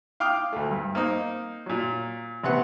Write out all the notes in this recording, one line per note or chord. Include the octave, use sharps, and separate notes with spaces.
F5 G5 D6 D#6 F6
D2 A3
G2
A#3 C4 D#4
A#2 F#3
A1 C3 B3 F#5